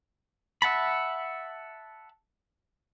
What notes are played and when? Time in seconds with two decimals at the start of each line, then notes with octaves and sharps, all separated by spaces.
0.62 E5 F#5 A5 B5